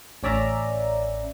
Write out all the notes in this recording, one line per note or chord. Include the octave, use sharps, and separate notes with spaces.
A1 C#4 D5 E5 A#5